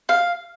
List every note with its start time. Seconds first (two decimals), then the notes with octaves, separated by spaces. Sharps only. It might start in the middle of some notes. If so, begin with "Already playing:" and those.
0.09 F5